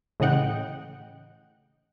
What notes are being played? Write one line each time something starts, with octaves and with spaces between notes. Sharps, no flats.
A2 C#3 E3 D#5 F#5 G5